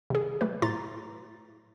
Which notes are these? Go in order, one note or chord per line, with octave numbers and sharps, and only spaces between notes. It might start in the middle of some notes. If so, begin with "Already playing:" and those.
C3 D#3 G#4
F#3 A3 B4
A2 E4 A#5 C6 A6